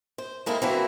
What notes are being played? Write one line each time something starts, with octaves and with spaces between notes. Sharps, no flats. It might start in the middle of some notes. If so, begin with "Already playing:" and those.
C5
G#3 A#3 C4 E4 A4
E3 A#3 C4 D4 E4 F#4